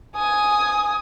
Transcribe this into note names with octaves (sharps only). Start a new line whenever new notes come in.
G#5 D#6